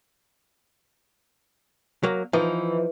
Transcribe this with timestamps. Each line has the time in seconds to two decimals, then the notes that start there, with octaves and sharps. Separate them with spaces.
2.03 F#3 A#3
2.33 E3 F3 D#4